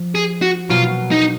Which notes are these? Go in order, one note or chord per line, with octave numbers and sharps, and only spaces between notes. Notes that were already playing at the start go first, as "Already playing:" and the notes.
Already playing: F3
G#4
F#4
B2 F#3 A#3 F4
D#4